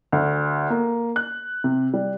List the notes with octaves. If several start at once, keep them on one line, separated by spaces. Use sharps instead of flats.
D2
A#3
F#6
C3
G3